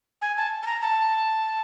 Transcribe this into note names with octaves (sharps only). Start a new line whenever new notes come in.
G#5
A5
A5
A#5
A5